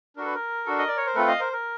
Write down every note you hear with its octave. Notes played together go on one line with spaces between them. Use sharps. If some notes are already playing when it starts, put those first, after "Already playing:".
D4 F#4 A4 A#4
B4
A#4
D4 F#4 A4
D#5
D5
C#5
C5
A3 C4 F4 A4 B4
D#5 F5
A#4 C5
A#4